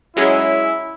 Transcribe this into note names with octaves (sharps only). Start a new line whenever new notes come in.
F#3 G#3 C#4 E4